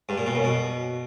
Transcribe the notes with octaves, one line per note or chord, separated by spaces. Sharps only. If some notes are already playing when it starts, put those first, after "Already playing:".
G2
A#2
B2
F#2
B2